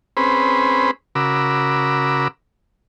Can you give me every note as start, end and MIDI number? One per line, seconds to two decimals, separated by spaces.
0.17 0.91 60
0.17 0.91 61
0.17 0.91 68
0.17 0.91 71
0.17 0.91 72
0.17 0.91 83
1.15 2.28 49
1.15 2.28 66
1.15 2.28 70
1.15 2.28 83
1.15 2.28 86
1.15 2.28 88